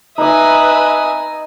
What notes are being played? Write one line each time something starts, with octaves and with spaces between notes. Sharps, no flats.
D#4 B4 D#5 E5 G#5 D#6